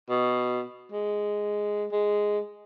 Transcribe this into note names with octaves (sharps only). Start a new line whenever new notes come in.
B2
G#3
G#3